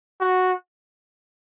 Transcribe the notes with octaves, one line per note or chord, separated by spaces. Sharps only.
F#4